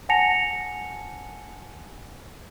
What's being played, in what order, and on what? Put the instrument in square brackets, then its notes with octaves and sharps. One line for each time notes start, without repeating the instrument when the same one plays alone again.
[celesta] F#5 G#5 A5 A#6 C#7 F7